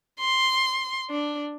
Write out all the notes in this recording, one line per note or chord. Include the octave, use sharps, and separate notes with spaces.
C6
D4